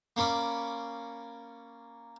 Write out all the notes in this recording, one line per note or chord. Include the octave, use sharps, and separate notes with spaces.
A#3 C#4 D5 B5 D6